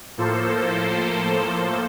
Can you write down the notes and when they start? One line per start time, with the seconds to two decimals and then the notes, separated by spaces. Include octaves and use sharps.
0.17 A2 F3 A#3 A4 C5